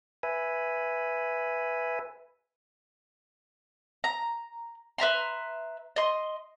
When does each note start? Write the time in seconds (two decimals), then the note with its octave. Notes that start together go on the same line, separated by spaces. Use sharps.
0.23 B4 E5 G#5
4.04 A#5
4.98 B4 E5 A#5 C6
5.96 D#5 C6